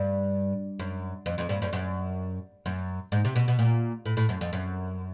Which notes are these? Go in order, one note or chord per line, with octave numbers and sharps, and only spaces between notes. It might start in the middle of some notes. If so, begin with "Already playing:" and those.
Already playing: G2
F#2
F2
F2
G2
F#2
F#2
F#2
G#2
C3
B2
B2
A#2
A2
A2
F#2
F2
F#2